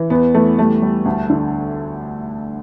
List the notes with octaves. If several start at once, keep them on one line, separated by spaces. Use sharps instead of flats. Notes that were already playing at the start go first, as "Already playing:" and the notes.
Already playing: E3
E2 B3
E3 A3
G3 A3
G3
D2
D3